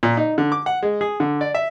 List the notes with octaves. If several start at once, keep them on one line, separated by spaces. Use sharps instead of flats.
A#2
D#4
D3
D6
F#5
G#3
G#4
D3
D5
E5